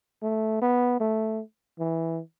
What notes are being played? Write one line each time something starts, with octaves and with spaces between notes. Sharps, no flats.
A3
B3
A3
E3